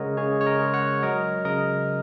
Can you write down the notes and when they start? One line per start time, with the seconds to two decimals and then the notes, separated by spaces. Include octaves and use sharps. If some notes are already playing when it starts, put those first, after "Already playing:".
Already playing: C#3 G#3 A#4 C#5 D#5 F#5
0.17 C#3 G#4 C#5
0.41 C#5
0.46 A#4 D#5
0.60 G#3
0.74 C#5 F#5
1.03 F#3 A#4 D#5
1.45 C#3 A#4 D#5